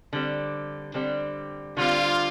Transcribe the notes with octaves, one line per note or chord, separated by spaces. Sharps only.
D3 G3 C4
D3 G3 C4
D3 G3 C4 F4